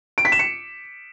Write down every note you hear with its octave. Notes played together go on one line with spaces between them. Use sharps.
D7
B6
E7
C#7